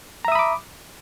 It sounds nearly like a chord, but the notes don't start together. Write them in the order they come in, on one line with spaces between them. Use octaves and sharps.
A#5 E5 D#6 B5 D6